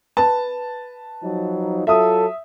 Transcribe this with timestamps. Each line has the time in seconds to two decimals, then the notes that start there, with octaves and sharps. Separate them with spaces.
0.17 B4 A5
1.23 F3 F#3 D#4
1.87 F#3 F4 A4 E5 D#6